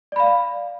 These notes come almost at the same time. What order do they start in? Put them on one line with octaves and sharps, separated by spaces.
D5 B5 F5